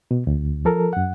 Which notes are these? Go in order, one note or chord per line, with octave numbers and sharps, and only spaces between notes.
B2
D2
F3 A4 A#4
F#2 F#5